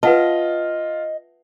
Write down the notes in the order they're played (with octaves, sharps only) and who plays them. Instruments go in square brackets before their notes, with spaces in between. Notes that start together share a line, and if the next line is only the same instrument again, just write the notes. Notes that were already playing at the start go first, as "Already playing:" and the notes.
[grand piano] F4 [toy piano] B4 F#5 A5 [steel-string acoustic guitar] D#5